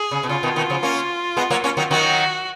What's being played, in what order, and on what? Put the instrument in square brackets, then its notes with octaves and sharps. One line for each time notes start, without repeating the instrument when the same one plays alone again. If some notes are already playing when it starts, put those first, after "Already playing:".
Already playing: [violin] G#4
[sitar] C#3
B2
[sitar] C#3 [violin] F4
[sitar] B2 D#3
B2 D#3
C#3 F3
A#3 C#4
G#3 B3
F#3 A#3
A#3 C#4
D#3 F#3
[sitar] D#3 F#3 [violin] F#4